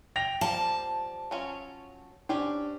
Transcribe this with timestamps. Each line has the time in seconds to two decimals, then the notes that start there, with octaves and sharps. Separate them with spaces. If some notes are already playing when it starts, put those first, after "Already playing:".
0.16 G5 A#6 F7
0.41 F3 G3 A#3 A5
1.31 F#3 C#4 F4
2.29 C#4 D4 G4 C5